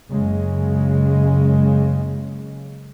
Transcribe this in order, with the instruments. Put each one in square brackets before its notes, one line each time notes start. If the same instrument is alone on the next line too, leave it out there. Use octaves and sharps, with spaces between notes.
[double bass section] F#1 C#3 G#3